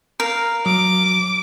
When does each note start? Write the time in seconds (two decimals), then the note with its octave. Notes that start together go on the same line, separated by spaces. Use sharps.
0.20 A#4 F5
0.66 F#3 D6